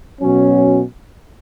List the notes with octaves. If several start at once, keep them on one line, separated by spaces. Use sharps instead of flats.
B2 F#3 C#4